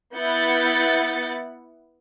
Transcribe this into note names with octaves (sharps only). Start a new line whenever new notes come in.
B3 E4 F#5 G6 A6 C#7